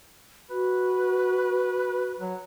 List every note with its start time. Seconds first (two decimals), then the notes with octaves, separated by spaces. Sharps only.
0.50 F#4 B4
2.19 F#3